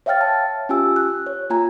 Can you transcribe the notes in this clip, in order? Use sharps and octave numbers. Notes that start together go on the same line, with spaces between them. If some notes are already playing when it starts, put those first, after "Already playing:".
C#5 E5 F5 G5 F6 A6
A5
C#4 F4 G4 G#5 E6
F#6
C#5
A#3 F4 G#5 A#5 G#6